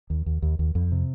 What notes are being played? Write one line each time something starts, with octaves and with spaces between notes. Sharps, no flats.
D#2
D#2
D#2
D#2
F2
C3